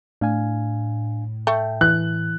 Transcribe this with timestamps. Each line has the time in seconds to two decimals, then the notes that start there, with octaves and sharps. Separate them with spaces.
0.21 A2 D4 F5 G#5
1.47 A3 G5
1.81 E3 F#6